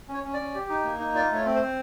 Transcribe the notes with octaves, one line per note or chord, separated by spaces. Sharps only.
C#4
C#5
C#4
D5
C#4
G4
D#4
A#3
D#4
F4 D5
A3 C#5
C4
C5
C4